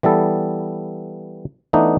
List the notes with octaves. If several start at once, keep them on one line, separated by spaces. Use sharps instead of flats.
E3 G3 B3 A4
E3 A3 B3 D4 D#4